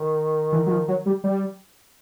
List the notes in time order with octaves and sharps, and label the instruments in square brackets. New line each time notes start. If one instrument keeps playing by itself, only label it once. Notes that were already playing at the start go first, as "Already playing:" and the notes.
Already playing: [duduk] D#3
[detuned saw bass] E3
F#3
F3
F#3
G3
G3